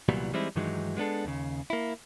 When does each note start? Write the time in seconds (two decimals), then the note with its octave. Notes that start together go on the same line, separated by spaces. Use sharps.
0.09 C2 A#2 E3 F#3 G3 B3
0.33 E3 G3 G#3 C4 D#4 E4
0.56 G2 D#3 E3 F#3 G#3 D#4
0.97 G#3 B3 D4 A4
1.25 D#2 C#3
1.70 A#3 E4